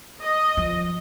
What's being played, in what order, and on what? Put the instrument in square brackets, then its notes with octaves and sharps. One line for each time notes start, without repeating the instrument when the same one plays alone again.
[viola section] D#5
[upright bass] F3